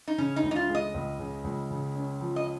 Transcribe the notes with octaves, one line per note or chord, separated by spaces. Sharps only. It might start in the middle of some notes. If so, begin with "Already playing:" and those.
D#4
C#3 C#4
D#4
C#2
D#4
F4
G#3
D#5
C#2
C#3
C#2
C#3
C#4
F3
D#5